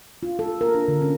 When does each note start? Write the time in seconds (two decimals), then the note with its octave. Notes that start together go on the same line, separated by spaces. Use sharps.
0.23 F4
0.39 A4
0.61 A#4
0.75 D4
0.88 D3
1.02 C#4